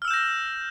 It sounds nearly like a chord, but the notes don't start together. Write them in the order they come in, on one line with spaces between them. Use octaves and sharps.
F6 E6 E7 G6 A#6